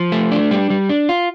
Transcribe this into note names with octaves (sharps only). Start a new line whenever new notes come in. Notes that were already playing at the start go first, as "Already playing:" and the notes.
Already playing: F3
A3
D4
G3
G3
D4
F4